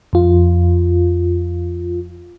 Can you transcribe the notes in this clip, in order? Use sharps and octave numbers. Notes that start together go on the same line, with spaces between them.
F2 F4